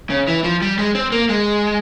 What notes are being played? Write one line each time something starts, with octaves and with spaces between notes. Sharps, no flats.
C#3
E3
F3
G3
G#3
C4
A#3
G#3